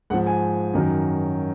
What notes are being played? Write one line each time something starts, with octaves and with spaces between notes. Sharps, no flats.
G#2 F3 F#5
G#5
F#2 D#3 F#3